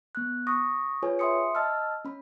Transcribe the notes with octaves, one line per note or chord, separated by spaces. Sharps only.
B3 F#6
C#6 D#6 A#6
F4 G#4 B4 C#5 G#5
E5 G5 C6 D#6 C#7
D#5 A5 E6 F6
C#4 B5